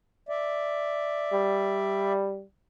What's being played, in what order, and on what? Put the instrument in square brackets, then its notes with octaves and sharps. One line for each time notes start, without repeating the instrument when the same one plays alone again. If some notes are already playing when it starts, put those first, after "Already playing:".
[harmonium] D5 E5
[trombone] G3